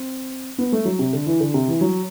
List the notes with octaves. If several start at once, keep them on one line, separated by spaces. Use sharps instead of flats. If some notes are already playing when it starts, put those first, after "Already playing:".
Already playing: C4
B3
A3
F#3
C3
D3
E3
D3
C3
E3
F#3